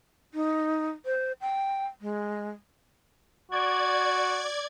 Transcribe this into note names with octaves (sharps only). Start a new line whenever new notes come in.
D#4
C5
G5
G#3
F#4 D5 G#6